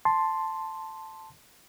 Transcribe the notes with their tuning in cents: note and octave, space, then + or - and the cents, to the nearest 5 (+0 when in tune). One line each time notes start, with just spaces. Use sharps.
A5 +0 C6 +0